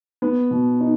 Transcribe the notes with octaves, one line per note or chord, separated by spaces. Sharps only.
B3
B2
D#4